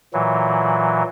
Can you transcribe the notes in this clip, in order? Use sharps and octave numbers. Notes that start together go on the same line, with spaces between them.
A#2 E3 F#3